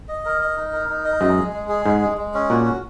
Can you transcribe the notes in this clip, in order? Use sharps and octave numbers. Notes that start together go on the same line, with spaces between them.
D#5
A#4
D#5
D#4
A#4
D#4
D#5
F#2 G#3
G#4
G#3
G#4
G#2 G#3
G#3
G#3
C#4
A#2 F#4
F#4